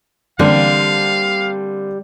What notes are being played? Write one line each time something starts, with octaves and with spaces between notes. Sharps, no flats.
D3 G3 A#3 C4 F5